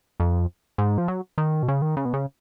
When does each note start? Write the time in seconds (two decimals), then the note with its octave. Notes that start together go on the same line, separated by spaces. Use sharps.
0.20 F2
0.78 G#2
0.98 F3
1.08 F#3
1.38 D#3
1.63 B2
1.68 C#3
1.82 D#3
1.97 C#3
2.05 B2
2.13 C#3